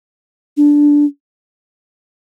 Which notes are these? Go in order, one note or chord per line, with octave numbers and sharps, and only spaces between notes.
D4